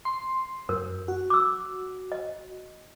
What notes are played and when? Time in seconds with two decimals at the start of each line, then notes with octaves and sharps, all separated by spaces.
0.05 C6
0.69 F#2 A#4
1.08 F#4
1.30 D6 E6
2.12 D#5